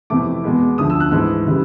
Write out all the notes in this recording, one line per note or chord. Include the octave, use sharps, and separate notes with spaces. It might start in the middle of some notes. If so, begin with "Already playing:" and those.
F2 C3 E3 A3 D6
E2 B2 G#3 B3
D2 D3 F3 D#6
E6
F#6
G#2 E3 A3 E6
C#3 E3 G3